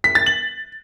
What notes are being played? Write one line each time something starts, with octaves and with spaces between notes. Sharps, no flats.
B6
A6
F#7